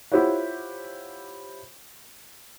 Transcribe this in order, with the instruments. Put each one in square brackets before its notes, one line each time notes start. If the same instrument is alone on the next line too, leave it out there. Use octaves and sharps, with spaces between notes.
[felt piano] E4 F4 G4 C5 C#5 F#5